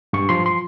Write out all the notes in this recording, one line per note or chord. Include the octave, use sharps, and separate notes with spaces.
G2 C#6
F3 C6
C6